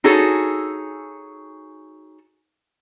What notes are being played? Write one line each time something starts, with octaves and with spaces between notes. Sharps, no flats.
D#4 F#4 G#4 A4 C#5